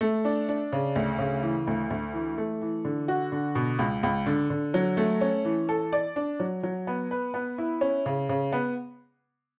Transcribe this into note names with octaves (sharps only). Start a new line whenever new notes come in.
A3
D4
D4
C#3
D2
C#3
E3
D2
D2
E3
A3
E3
D3
F#4
D3
B2
C#2
C#2
D3
D3
F#3
A3
C#4
E3
A4
D5
D4
F#3
F#3
B3
B4
B3
E4
C#4
C#3
C#3
B3